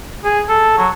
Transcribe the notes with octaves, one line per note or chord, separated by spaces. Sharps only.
G#4
A4
F#3